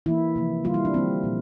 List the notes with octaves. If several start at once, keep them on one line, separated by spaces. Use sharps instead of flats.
E3 A#3 E4
C3 F3 A#3
D3 G3 A#3 F4
E4
D4
E3 G3 A#3 C4
A#2 F3